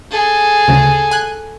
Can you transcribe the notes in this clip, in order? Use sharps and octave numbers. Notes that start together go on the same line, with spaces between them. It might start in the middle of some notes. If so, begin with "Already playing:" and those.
G#4 A4
D2 C#3
G#5 F#6